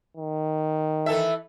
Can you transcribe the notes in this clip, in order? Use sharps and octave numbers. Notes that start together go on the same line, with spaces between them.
D#3
E3 A4 E5